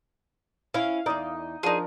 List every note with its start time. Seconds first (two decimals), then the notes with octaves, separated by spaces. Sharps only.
0.74 C#4 E4 F5
1.06 E2 D#4 D5 D#5
1.63 F3 D4 D#4 G#4 A#4